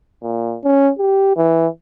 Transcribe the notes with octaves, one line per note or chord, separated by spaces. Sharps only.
A#2
C#4
G4
E3